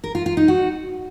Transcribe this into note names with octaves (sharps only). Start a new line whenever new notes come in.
A#4
F4
F4
D#4
F#4